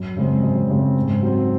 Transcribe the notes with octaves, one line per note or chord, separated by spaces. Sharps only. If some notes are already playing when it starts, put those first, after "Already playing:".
Already playing: F#2
C#3 G#3 C4
F#2
C#3 G#3 C4
G#2
F#3 C4